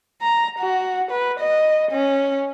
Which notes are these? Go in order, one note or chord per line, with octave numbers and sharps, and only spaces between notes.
A#5
F#4
B4
D#5
C#4